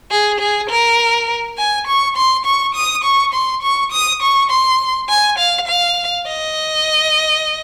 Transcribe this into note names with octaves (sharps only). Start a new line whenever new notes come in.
G#4
G#4
A#4
G#5
C#6
C6
C#6
D#6
C#6
C6
C#6
D#6
C#6
C6
G#5
F5
F5
D#5